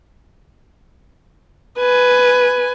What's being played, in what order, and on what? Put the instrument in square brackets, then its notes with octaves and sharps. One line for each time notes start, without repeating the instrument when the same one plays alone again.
[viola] B4 G#5